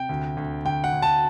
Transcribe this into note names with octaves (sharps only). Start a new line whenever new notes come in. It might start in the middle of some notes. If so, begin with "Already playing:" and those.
Already playing: C3 G5
D2
D2
D2 G5
F#5
D2
A5